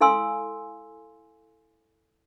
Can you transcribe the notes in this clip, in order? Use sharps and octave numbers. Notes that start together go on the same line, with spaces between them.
E4 A4 F5 G#5 C6 E6